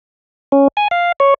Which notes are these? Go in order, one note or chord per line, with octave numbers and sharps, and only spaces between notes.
C#4
G#5
F5
C#5